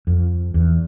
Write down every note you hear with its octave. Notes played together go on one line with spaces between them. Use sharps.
F2
E2